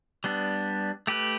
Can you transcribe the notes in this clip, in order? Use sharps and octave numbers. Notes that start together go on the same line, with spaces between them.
G3 B3 D4
A3 G4 B4